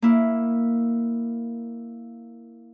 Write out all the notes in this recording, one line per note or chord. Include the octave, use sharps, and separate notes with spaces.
A#3 E4